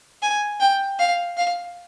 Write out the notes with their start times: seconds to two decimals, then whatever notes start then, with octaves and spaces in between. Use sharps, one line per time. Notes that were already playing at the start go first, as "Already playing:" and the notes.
0.22 G#5
0.60 G5
0.99 F5
1.37 F5